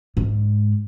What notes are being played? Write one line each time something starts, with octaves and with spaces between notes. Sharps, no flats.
G#2